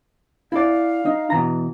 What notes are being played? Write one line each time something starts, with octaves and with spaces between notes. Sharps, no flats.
E4 D5 F5
D#4
B2 E3 A#5